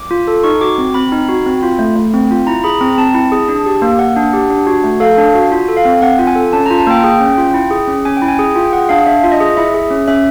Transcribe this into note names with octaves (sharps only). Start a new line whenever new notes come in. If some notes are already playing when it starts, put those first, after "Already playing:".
Already playing: D6
F4
A4
D#4 C#6
F#4 D6
C4
C4 B5
D#4
F#4
C4
F4
A3
A3
C4
F4
E4 A#5
G#4 B5
C4 A#5
C4 A5
E4
G#4
D4
G4
A#3
A#3 F#5
D4
G4
D4
F#4
A3
A4 F5
D4
F#4
F4
A4
F5
C4
C4 F#5
F4
G#5
A4
C#4 A5
F4 A#5
A5
A#3 G5
G#4 G5
C#4
F4
E4
G#4
C#4
C#4 G#5
G5
E4
G#5
G#4
F4 G5
G#4 F#5
D4 F5
D4 E5
F4
D#5
G#4
E4 E5
G#4
C#4
C#4 E5